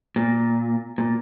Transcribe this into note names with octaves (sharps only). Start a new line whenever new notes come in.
A#2
A#2